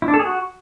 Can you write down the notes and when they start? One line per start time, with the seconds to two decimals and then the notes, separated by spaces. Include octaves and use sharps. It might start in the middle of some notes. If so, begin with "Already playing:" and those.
0.02 E4
0.08 D4
0.14 A4
0.19 G#4
0.25 F#4